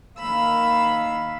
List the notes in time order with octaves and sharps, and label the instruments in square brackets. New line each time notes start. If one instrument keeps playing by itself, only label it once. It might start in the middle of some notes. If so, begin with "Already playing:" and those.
[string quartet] D#3 A#3 F5 B5 E6